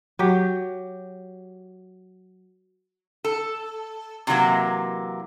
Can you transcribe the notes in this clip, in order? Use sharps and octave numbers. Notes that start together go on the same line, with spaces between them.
F#3 G4
A4
C3 E3 F#3 A#3